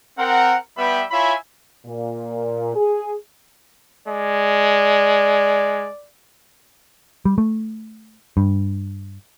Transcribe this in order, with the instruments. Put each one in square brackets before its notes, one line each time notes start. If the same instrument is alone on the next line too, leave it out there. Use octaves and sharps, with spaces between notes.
[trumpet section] C4 A#4 F#5
G3 B3 B4 E5 G5 B5
E4 F4 C#5 E5 G#5 B5
[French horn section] A#2
G#4
[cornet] G#3 [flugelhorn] D5
[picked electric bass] G3
A3
G2